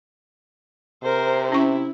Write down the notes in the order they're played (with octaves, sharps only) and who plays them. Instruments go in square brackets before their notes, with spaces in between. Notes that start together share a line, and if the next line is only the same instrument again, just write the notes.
[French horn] C3 [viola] A#4 C5
[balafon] C#4 C#6 [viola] E4